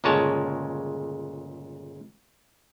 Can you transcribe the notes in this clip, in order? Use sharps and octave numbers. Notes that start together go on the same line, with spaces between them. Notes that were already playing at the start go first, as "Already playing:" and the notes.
G1 A#2 C#3 G#3 C#5 A5